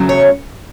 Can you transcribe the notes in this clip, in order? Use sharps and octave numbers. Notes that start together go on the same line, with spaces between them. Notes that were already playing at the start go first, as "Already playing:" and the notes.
Already playing: E2 C#3 F#3 A3
C#5